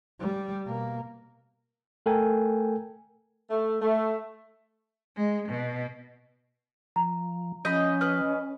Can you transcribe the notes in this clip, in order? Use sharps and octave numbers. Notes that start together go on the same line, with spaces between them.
G3
B2 A#3
A3 A4 A#4 G5 G#5
A3
A3
G#3
B2
F3 A#5
F3 C#4 D#5 B5 G6
B4 D#5 F6